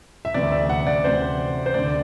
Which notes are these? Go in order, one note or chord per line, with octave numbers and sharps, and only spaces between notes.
E5
D2 C3 E3 D5
E5
F#5
D5
D2 C3 E3 C5
C5
D2 D3 D5